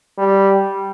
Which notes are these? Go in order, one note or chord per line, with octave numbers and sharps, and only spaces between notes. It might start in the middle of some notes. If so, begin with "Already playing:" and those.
G3